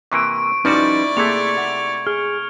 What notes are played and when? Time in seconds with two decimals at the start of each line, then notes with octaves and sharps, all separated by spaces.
0.12 C3 E3 A#3 C#6 D7
0.65 F3 G3 C#4 D#4 E4 F#4 B4 D5
1.17 C3 A3 A#3 G#4 G#6 C#7 F7
1.58 F#5
2.07 G#4 F6